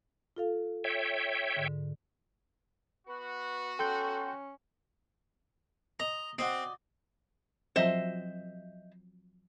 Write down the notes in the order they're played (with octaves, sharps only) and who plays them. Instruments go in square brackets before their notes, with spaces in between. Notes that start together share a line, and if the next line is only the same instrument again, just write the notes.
[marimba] F4 A4 F5
[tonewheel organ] C#5 E5 G5
[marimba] G#2 D3
[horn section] B3 F#4 [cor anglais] B4
[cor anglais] C#4 [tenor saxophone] A4 [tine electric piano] G5 C6 G6
[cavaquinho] D#5 [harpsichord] A#5
[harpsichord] C4 [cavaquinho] F#4 D5 D#5
[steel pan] F3 F#3 C4 [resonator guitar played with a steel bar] C5 D#5 E5